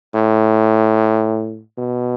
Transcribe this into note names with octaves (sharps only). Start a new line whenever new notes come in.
A2
B2